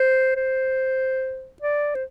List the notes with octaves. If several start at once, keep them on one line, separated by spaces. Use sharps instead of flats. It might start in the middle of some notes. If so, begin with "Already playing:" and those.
Already playing: C5
C5
D5
C5